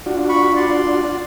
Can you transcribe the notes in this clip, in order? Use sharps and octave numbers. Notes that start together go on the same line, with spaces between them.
D4 F4 F#4
B5 C#6
D5 C6